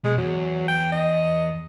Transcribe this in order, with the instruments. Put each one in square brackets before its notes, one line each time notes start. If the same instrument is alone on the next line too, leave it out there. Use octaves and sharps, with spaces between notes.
[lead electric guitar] B2 [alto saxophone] G#3
[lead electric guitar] E2 [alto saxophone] F#3
[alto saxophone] G5
D#5